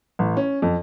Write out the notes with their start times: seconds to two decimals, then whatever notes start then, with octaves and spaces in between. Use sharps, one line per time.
0.19 A1
0.37 C#4
0.62 F2